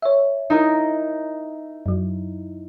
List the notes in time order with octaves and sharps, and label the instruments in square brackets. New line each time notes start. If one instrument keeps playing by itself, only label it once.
[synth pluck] C#5 E5
[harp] D#4 E4 A#4
[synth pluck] F#2 F#3